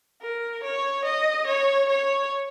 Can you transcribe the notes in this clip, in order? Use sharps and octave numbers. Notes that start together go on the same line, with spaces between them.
A#4
C#5
D#5
C#5
C#5